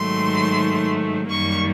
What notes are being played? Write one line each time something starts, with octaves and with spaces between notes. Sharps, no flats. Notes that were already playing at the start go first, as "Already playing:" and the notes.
Already playing: G#2 D#3 F#3 A3 C6
F#2 D#3 G3 A#3 C#6